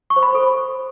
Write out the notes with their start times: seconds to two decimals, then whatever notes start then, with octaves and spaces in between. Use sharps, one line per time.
0.10 C#6
0.16 C5
0.22 B5
0.29 C5
0.35 A4